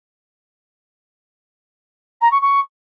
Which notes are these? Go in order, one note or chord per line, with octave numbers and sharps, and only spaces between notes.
A#5
C#6
C#6